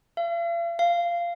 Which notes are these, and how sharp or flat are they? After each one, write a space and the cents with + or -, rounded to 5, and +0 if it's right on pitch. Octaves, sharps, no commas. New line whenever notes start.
F5 -45
F5 -15